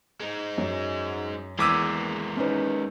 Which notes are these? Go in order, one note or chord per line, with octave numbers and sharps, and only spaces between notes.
G#3 D#4
F#2
E2 G#3 A#3 D6 E6 G#6 B6 D#7
C#4 D#4 B4